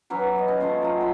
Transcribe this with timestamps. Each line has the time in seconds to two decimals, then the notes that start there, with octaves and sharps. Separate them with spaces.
0.10 E3 F#3 C#4 B4
0.35 E4 D#5
0.48 C#4
0.60 A3 C#4 F4 C5
0.82 F#3 F4
0.99 D#5 B5 C6